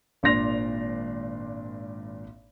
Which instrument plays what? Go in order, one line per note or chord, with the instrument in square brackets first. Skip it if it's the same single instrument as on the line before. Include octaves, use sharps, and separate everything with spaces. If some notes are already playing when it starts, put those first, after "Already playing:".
[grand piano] G#1 A#2 D4 C6 A#6 F7